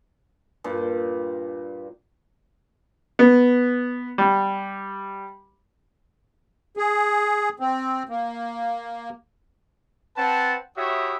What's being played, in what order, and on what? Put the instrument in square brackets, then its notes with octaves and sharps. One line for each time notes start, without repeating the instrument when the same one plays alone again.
[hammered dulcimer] G2 A#2
[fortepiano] B3
G3
[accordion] G#4
C4
A#3
[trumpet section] C4 B4 F#5 A5
E4 F#4 G4 C#5 E5 D#6